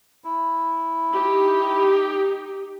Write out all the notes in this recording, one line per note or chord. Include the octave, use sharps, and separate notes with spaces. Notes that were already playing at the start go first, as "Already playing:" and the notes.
E4
D#4 G4